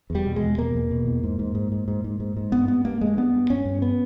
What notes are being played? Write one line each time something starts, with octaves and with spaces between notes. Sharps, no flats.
E2
G3
B2
G#3
E2
B2 A#3
E2
B2
E2
G#2
G#2
G#2
G#2
G#2
G#2
G#2
G#2
G2 B3
G2 B3
G2 A#3
G2 G#3
G2 B3
G2
G2 C#4
G2
B3